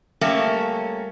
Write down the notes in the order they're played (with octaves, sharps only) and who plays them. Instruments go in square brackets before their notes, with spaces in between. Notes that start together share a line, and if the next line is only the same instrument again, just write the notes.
[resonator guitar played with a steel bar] G3 A3 A#3 C#4 A#4 E5